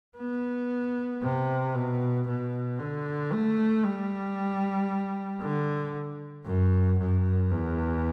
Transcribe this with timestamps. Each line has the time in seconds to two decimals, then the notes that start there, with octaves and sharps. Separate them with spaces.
0.18 B3
1.23 C3
1.75 B2
2.28 B2
2.79 D3
3.33 A3
3.85 G3
5.41 D3
6.46 F#2
7.00 F#2
7.51 E2